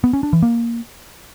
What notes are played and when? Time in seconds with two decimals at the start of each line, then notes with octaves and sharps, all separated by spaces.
0.04 B3
0.13 C#4
0.23 D4
0.33 E3
0.43 A#3